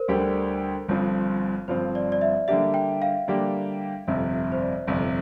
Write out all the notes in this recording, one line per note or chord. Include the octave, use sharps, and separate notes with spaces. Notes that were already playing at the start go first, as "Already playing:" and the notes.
Already playing: A#4 C5
D2 D3 G3 D4 G4
G1 G2 F3 C4
G1 G2 F3 C4 C5
D5
D5
E5
D3 G3 A#3 D4 G4 E5
G5
F5
D3 G3 A#3 D4 G4
G1 F2 C3 E5
E5
C5
D5
G1 F2 C3 E5